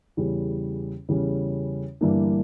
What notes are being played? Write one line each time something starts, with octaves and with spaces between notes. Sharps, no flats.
E2 C#3 G3 C#4
E2 C#3 G3 C#4
G1 G2 E3 A#3 D4